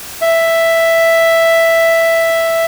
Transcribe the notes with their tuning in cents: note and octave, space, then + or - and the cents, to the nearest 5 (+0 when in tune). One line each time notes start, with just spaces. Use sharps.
E5 +5